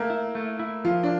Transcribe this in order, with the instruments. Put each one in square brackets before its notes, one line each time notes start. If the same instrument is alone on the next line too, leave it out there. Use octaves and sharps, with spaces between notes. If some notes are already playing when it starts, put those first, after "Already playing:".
Already playing: [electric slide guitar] A3 [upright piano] A#3
[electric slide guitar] E4
A3
E4
[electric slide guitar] F3 [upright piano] F4
[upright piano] D4